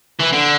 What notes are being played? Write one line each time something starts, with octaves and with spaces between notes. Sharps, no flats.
E3
D3